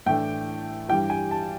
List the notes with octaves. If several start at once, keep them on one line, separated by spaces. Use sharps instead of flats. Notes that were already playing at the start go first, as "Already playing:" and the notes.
A2 E3 A3 D4 G5
G2 E3 G3 G5
G#5
A5